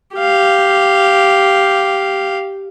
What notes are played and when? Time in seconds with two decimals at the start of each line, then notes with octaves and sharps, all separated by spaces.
0.17 G4 F5